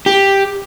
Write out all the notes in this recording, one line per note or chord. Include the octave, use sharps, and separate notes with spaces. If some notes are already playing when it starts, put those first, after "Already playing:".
G4